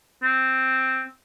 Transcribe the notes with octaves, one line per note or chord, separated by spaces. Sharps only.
C4